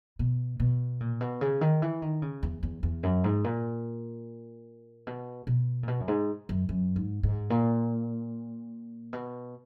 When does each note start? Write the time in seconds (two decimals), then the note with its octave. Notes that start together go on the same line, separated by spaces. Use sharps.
0.19 B2
0.60 B2
1.00 A#2
1.21 B2
1.41 C#3
1.61 D#3
1.82 E3
2.02 D#3
2.22 C#3
2.43 E2
2.63 E2
2.83 E2
3.03 F#2
3.24 G#2
3.44 A#2
5.07 B2
5.47 B2
5.83 A#2
5.88 B2
6.00 F#2
6.08 G#2
6.49 F#2
6.69 F#2
6.96 G#2
7.23 G#2
7.50 A#2
9.13 B2